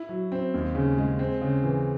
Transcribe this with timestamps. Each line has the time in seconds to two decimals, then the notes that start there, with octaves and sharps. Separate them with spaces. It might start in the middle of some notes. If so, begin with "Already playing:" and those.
Already playing: E4
0.09 F#3
0.32 C4
0.54 D#2
0.75 C#3
0.98 G#3
1.19 C4
1.42 C#3
1.63 E3